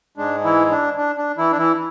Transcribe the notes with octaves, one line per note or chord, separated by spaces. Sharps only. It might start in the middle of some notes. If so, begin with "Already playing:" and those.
G#2 G#3 D4
E3 E4
D4
D4
D4
E3 E4
D4
E3 E4